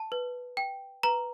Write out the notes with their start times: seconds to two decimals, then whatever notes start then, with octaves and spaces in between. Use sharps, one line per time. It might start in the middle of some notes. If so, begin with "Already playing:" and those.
Already playing: A5
0.12 B4
0.57 G5
1.03 B4 A#5